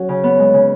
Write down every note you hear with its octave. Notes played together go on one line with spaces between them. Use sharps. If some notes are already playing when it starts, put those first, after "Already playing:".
Already playing: F#3 C#4 F#4
C#3
B3
G#3
C#3